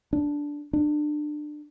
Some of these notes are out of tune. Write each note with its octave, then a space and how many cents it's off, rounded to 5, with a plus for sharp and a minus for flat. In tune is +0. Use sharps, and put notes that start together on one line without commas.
D4 -10
D4 +25